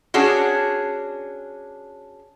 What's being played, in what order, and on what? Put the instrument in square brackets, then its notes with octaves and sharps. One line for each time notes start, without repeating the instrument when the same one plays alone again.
[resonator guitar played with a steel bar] C#4 D4 F#4 G#4